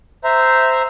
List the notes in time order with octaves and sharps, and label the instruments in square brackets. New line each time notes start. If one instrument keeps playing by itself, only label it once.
[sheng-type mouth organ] C5 E5 A#5